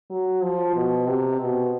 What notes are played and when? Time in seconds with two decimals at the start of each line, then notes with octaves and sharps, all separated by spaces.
0.11 F#3
0.43 F3
0.76 B2
1.08 C3
1.41 B2